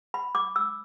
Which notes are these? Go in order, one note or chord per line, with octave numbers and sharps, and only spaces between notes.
B5
D6
E6